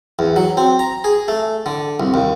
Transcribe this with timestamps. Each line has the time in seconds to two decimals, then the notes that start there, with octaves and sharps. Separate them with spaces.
0.19 E2
0.36 F#3
0.57 C4
0.79 A#5
1.04 G#4
1.28 A3
1.66 D3
2.00 C2
2.14 D#2